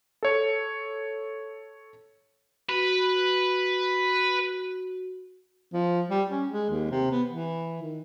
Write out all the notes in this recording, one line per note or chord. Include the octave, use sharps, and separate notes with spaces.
A4 C#5
F#4 B4
F3
G3
C#4
G#3
D#2
C3
B3
E3
D#3